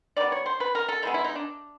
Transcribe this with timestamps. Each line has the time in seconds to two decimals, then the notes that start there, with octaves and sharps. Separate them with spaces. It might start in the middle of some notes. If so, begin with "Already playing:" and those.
0.17 D#3 G3 B3 D5
0.32 C#5
0.46 C5
0.60 B4
0.75 A#4
0.89 A4
1.02 D#3 G#3 B3 E4
1.14 E4
1.24 D#4
1.35 D4